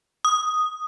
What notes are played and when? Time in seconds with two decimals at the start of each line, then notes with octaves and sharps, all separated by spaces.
0.25 D#6